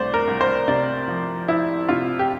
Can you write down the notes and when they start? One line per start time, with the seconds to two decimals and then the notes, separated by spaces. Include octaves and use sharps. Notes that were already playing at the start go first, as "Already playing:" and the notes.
Already playing: C2 A3 C5 D5
0.14 A#4
0.27 C2
0.41 C5
0.68 C3 D5
1.08 F3
1.48 F3 E4
1.89 C3 F4
2.19 G4